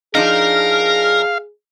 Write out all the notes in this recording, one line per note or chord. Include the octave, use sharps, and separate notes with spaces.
F3 D4 D#4 G#4 A#4 F5